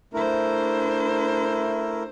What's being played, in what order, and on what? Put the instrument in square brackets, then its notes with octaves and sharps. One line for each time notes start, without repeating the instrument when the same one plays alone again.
[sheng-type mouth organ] A3 E4 A#4 [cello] D4 C5